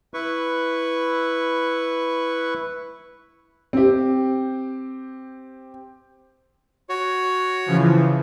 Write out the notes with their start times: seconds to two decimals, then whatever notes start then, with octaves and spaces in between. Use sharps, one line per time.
0.14 E4 B4 C#6
3.73 C4 G4
6.89 F#4 C#5
7.66 C#3 E3 F3